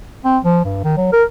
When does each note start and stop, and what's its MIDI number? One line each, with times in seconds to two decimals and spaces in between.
0.25 0.38 60
0.45 0.61 53
0.65 0.83 43
0.84 0.97 51
0.97 1.12 54
1.13 1.24 70